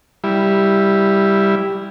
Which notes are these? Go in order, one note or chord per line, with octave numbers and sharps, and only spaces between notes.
G3 E4